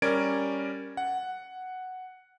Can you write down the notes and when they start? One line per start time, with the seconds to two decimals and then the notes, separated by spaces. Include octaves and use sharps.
0.02 G3 C#4 A#4 D5 G#6 D7
0.97 F#5